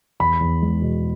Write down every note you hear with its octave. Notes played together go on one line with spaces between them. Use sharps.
E2 B5
E2
G#3
B2